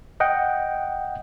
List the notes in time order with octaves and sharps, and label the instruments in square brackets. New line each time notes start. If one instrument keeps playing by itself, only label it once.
[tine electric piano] D#5 F#5 G5